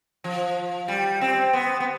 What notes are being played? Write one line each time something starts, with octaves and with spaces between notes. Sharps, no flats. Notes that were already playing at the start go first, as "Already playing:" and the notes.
F3
G3
C4
B3
B3